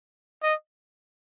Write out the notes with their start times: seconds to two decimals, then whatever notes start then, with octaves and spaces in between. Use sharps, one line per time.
0.43 D#5